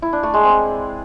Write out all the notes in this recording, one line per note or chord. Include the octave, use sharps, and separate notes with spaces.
E4
D4
A3
G#3
C4